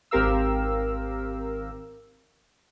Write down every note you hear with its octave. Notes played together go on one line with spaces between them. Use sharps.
G#1 C4 G4 A#4 F5 E6